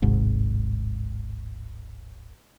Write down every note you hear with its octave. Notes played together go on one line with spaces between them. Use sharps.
D1 G#1 G#2 C3